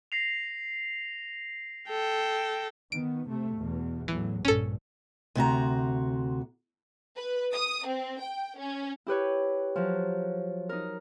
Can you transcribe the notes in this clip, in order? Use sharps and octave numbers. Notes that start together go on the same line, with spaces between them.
A#6 C7 F7
A4 G5
D#3 B3 D7
C3 A3
E2 B2
E2 A2 E3 F#3
A#1 G2 A#2 C#4 A4
D2 C3 F#4 A#5
B4
D#6
C4
G5
C#4
E4 G4 B4 C#5
F3 F#3
D#4 A#4